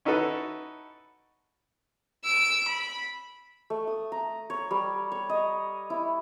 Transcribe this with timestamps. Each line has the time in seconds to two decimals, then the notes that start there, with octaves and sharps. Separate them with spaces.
0.05 C#4 D#4 E4 F#4 A4 B4
2.25 E6 D7
2.67 B5
3.70 A3
3.87 D#6
4.12 A#5
4.50 C#5
4.71 G3
5.12 C#5
5.29 D#5
5.90 E4